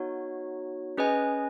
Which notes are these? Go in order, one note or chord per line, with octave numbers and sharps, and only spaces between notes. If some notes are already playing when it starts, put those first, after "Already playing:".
Already playing: B3 D#4 F#4 C#5
C#4 G#4 B4 D#5 G#5